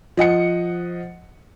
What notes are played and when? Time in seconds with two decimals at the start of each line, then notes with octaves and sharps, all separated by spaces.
0.17 F3 D#5 F#5 C#7